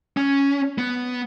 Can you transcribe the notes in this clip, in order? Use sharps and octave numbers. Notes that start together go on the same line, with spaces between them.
C#4
B3